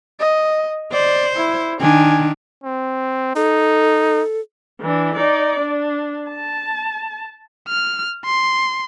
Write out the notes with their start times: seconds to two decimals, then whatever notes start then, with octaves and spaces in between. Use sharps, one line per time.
0.20 D#5
0.93 C5 D5
1.36 E4
1.80 D#3 D4 G#5
2.64 C4
3.36 D#4 A4
4.81 E3 D4
5.15 D#4 D5
5.60 D4
6.30 A5
7.69 F6
8.25 C6